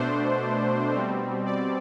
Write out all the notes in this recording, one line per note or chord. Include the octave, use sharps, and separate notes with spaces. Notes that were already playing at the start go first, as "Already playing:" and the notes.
Already playing: B2 A3 D4 C5
B2 G3 C4
D5